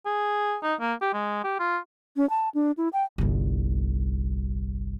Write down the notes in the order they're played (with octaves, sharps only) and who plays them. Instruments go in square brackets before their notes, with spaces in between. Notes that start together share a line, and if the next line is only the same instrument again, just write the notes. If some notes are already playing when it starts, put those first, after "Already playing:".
[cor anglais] G#4
D#4
A#3
G4
G#3
G4
F4
[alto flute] C#4
A5
D4
E4
G5
[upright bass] G1 C2